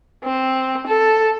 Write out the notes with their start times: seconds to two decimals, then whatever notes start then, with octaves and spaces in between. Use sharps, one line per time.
0.24 C4
0.87 A4